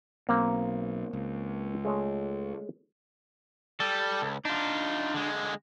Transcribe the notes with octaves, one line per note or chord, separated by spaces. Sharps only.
B1 A#3 C4 F5
C#2
G#3 A3 C#5
G3 A4
C#2
D4 D#4 F4
D3 G#3